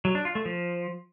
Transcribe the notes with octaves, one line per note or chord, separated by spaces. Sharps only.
F#3
D4
F4
A3
F3